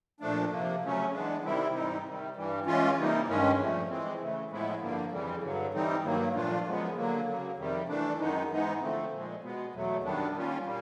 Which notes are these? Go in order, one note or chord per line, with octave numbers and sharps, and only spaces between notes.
A#2 F3 A3 D4
C3 F3 A#3
C#3 F#3 A3 C#4
E3 G#3 B3 D4
C3 D#3 G3 C4 E4
G#2 E3 G3 C4 D#4
C3 D#3 G3
G2 E3 G3
E3 G#3 C#4 F4
C3 E3 G3 A#3 D#4
G2 D#3 G#3 C#4
A#2 F3 A3
E3 G#3 C4
C#3 E3 A3
A2 F3 G#3 B3 E4
G2 D3 F3 A#3
F2 C#3 E3 G3
G2 D3 F#3
E3 G3 C4 D#4
G2 D#3 F#3 A#3
A#2 F3 A3 D4 F4
F#2 C#3 F3 G#3 B3
D3 F#3 A#3
C#3 F#3 A#3
F2 C3 D#3 G3
E3 A3 D4
F#2 D#3 G#3 B3 D#4
G#2 E3 G#3 B3 D#4
D3 F3 A3 C4
A#2 F3 G#3
B2 G#3 B3
E2 B2 F#3 A3
F#2 D#3 G3 B3 D4
D#3 G3 A#3 C#4 F4
A#2 G3 A#3